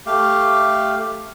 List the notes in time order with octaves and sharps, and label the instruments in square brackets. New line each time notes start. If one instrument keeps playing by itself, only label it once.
[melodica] A3 G4 F5